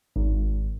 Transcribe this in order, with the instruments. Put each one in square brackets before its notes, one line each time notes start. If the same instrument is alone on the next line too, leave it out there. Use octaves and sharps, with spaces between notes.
[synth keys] G#1